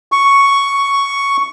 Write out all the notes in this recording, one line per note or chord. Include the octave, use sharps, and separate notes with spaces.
C#6